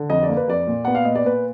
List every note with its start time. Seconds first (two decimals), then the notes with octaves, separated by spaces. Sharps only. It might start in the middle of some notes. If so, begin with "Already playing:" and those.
Already playing: D3
0.10 F2 D#5
0.23 D5
0.29 A#3
0.37 B4
0.48 F2 D5
0.67 A#2
0.85 B3 F#5
0.95 F5
1.05 A#2 D#5
1.15 D5
1.25 A#2 B4